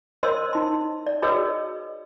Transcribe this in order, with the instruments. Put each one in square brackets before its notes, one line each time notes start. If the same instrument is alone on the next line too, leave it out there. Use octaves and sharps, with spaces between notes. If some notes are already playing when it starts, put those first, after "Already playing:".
[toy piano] A#4 C5 C#5 D#5 C6 E6
D#4 C6
D5
F#4 G#4 B4 C#5 D#5 E6